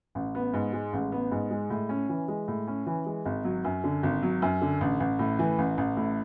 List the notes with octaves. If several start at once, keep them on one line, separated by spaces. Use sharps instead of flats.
A1
B3
G#2
G#3
A1
B3
G#2
G#3
A2
C#4
E3
G#3
A2
C#4
E3
G#3
G#1
F#3
F#2
D3
G#1
F#3
F#2
D3
A1
A1
A2
E3
A1
A1
A2